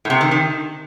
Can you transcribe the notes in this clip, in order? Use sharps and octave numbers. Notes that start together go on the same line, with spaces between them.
A2
C3
D#3
D#3